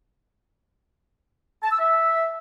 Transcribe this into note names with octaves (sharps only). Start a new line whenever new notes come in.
A5
E6
E5